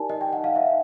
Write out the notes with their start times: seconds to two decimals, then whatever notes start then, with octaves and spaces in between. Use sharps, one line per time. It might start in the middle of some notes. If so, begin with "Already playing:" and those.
Already playing: D#4 G4 A#4 D5 G#5 A5
0.10 D#5
0.21 G5
0.33 F#5
0.44 F5
0.56 E5